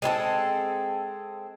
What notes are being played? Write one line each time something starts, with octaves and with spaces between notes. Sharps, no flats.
G#3 C4 E4 A4